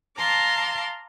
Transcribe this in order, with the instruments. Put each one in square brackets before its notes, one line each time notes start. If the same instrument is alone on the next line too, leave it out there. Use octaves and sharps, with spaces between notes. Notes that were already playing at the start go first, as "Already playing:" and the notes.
[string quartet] F5 A5 A#5 C6 D6